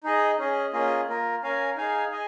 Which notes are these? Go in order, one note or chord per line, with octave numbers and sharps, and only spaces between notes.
D#4 G#4 D#5
C#4 G#4 D#5
A#3 C#4 F4 G#4 D#5
A#3 F4 A#4
C#4 A#4 F5 G#5
D#4 G#4 F5 G#5
G#4 D#5 G#5